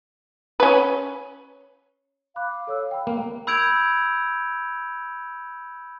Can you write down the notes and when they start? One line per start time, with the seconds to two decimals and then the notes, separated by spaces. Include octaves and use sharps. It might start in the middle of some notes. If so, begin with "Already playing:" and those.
0.60 C#4 B4
2.36 F5 B5 D6 F#6
2.67 A4 C#5 E6
2.91 G5 B5
3.07 A#3
3.47 B5 E6 G6 G#6 D7 F7